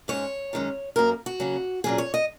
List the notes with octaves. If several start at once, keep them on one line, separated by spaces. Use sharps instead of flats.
G#2 G#3 C#4 C#5
F#2 D#3 G#3 C#4
F#2 F#3 A#3 A#4
F#4
C#3 F#3 A#3 C#4
A#2 F#3 A#3 C#4 G#4
C#5
D#5